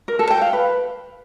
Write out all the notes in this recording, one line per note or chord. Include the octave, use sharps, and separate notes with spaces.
A#4
A4
G5
F5
B4